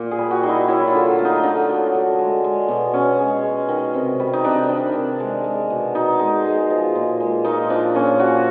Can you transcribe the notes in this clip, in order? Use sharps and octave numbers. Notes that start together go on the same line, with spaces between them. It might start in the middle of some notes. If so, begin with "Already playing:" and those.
Already playing: A#2
G#4
G3
F#4
G3 D#4
E4
F#3 E4
F4
D3
A3
D#4
D3 D4
F#3
D3
G#3
G#3
B2
B2 C#4
G#3
G#3
D#3
C3
G3
D#4
C3 D4
D#3
C3
G#3
G#3
B2
B2 D#4
G#3
G#3
F3
A#2
G#3
A#2 D#4
F3 D4
A#2 C#4
F3 F#4